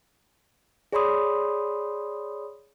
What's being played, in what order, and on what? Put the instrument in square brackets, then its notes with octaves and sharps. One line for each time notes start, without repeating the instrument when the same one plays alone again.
[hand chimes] G#4 C#5 D5 B5 C6 D#6